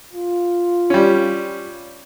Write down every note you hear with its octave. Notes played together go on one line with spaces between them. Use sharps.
F4
G3 C#4